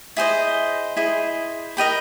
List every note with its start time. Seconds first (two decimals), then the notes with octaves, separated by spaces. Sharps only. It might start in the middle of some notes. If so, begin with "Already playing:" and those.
0.17 E4 G#4 C5 D#5
0.97 E4 G#4 C5 D#5
1.77 A#4 D#5 G5 B5